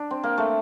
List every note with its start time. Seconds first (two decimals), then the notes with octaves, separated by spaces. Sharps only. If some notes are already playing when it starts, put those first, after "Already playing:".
Already playing: D4
0.11 C4
0.23 A#3
0.38 A3